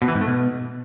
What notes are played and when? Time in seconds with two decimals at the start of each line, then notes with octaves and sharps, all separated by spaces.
0.02 B2
0.08 E3
0.15 G#2
0.21 A3
0.27 B2